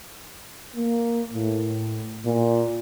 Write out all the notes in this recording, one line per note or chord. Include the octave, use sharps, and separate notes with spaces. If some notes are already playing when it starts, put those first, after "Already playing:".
A#3
A2
A#2